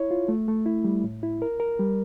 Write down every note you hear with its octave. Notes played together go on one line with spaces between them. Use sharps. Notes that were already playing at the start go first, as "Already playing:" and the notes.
Already playing: E4 C#5
F4
A3
A3
E4
G3
A2
E4
A#4
A#4
G3